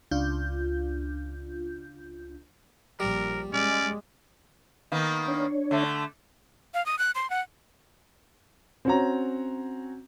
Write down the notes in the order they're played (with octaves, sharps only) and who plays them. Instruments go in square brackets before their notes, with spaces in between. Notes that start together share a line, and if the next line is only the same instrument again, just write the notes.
[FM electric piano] C#2 D4 F4 G6
[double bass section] A#1 [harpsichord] G3 [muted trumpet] A#4
[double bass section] G#3 [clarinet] C#4 [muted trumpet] D5
[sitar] D#3 A#3 B3
[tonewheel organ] D4 C#5
[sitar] D3 A3
[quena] F5
D#6
F#6
C6
F#5
[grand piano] C4 C#4 F#4 C#5 F#5 A#5